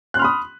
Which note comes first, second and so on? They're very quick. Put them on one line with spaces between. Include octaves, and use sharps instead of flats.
F#6 C6 F6 B5 D#6